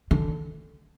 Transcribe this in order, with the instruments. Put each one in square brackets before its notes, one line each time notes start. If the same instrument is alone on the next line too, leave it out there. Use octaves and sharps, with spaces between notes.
[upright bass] D3